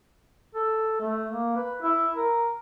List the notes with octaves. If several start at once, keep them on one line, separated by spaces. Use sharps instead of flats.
A4
A3
A#3
B4
E4
A#4